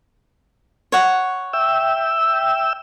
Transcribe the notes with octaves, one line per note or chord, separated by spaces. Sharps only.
C#5 F#5
E5 G5 E6